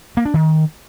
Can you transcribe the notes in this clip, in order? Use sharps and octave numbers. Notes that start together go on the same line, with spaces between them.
A#3
D4
D#3